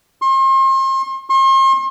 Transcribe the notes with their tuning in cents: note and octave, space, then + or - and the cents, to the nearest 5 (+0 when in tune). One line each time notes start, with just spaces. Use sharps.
C6 +40
C6 +45